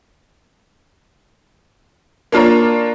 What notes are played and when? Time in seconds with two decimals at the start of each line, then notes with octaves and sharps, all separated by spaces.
2.32 A#3 D4 F4 C#5 A#5